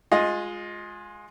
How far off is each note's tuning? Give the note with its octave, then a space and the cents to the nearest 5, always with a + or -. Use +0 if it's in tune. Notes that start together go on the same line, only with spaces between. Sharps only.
G#3 +0 F4 +20 D#5 +5